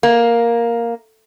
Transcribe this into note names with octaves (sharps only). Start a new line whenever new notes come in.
A#3